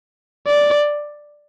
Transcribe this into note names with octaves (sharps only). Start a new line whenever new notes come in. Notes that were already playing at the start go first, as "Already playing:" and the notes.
D5